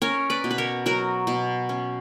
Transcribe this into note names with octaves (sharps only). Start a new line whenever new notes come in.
C#4 A#4 C#5
B4 D5
B2
B4
A#4 C#5
F#3 F#4 A#4
B2
C#4